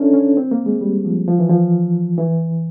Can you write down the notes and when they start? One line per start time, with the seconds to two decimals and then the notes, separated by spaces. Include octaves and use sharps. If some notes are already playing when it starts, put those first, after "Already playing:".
Already playing: C#4 D4 E4 A4 A#4
0.13 C#4
0.37 C4
0.51 A#3
0.66 G#3
0.81 G3
1.05 F3
1.28 F3
1.39 E3
1.49 F3
2.18 E3